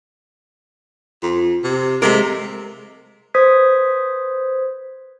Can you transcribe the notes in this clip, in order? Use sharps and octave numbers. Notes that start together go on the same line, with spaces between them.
F2
C3
C3 G#3 A3 A#4
B4 C5 D#6 G#6 B6